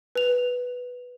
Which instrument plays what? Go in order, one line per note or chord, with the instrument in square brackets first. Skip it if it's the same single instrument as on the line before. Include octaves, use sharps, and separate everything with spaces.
[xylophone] B4 F7